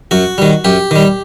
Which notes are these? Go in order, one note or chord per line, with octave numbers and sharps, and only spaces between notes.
F#2 F#4
D#3 G3
F#2 G4
D#3 G3